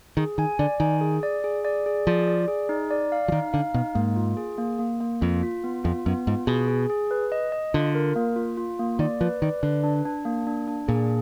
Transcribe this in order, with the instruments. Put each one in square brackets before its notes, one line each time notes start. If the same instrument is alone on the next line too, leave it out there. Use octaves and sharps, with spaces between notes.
[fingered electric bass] D#3 [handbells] G#4
[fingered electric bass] D#3 [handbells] G#5
[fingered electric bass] D3 [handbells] D5
[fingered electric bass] D#3 [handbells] G#5
[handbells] G#4
D5
G#4
D5
G#4
[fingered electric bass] F3 [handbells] D5
[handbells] D5
G#4
D#4
D5
F5
[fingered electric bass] F3
[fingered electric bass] D#3 [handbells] D#4
[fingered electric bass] D3 [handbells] F5
[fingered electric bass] B2 [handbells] D#4
[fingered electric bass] G#2 [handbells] A#3
[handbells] F4
G#4
A#3
A#3
A#3
[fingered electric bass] F2 [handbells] F4
[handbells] F4
B3
[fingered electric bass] F2 [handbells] F4
[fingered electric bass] F#2 [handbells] B3
[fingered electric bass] G#2 [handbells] F4
[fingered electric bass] B2 [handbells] G#4
[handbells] G#4
G#4
B4
D#5
D#5
[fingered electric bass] D3 [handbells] F4
[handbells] A#4
A#3
F4
F4
A#3
[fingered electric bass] D#3 [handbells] D5
[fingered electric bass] F3 [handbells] B4
[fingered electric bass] D#3 [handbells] D5
[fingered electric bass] D3 [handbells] B4
[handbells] D4
D4
A#3
D4
D4
[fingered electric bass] A#2 [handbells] G#4